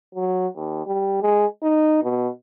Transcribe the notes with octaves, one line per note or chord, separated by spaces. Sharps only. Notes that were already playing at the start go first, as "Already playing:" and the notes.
F#3
D#2
G3
G#3
D#4
B2